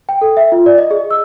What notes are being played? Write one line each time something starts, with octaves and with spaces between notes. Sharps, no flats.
G5
A4
E5
F4
D5
D#5
G#4
E6